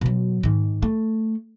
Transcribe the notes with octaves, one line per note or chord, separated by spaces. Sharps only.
B2 F#3
G#2 D#3
A3